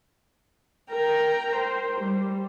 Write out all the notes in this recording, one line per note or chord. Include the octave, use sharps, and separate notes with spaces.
A#4 G5 A#5
C5
G3